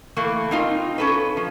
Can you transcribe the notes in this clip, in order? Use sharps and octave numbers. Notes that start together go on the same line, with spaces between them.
E3 A3 A#3
C4 D#4 F4
C#4 A4 B4
F3